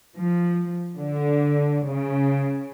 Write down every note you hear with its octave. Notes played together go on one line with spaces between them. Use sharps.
F3
D3
C#3